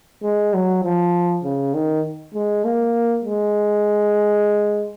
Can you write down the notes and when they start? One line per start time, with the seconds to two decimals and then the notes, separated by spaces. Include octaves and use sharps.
0.23 G#3
0.54 F#3
0.84 F3
1.44 C#3
1.74 D#3
2.34 G#3
2.64 A#3
3.25 G#3